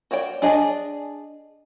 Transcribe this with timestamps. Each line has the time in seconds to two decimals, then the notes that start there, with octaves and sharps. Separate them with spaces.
0.11 F#4 C#5 D5 G5
0.42 D4 G#4 D5 D#5 G#5